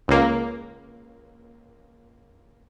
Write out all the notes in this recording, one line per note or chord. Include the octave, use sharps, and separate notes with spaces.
C#2 A#3